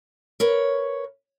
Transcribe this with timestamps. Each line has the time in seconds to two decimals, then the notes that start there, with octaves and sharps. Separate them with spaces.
0.40 A#4 B4 C#5